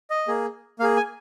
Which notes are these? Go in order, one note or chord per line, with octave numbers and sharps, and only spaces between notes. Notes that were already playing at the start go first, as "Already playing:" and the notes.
D#5
A#3 G#4
A#3 G#4 F5
G#5